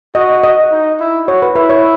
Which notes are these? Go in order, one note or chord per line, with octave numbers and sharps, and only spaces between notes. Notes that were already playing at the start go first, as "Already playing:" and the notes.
F#4 D#5
D#5
D#4
E4
F#4 C#5
B4
E4 B4
C#5